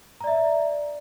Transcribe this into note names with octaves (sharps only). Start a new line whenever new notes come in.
D5 E5 A#5